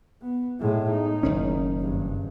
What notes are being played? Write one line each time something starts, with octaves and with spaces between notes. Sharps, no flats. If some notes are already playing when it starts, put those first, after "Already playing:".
B3
A2 G#3
D#4
F#1 D#3 C#4
G#1 G2